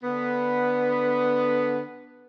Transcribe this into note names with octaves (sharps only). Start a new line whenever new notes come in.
D3 B3